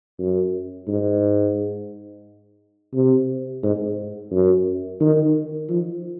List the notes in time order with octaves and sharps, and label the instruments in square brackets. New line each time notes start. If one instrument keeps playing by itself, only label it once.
[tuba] F#2
G#2
C3
G#2
F#2
D#3
F3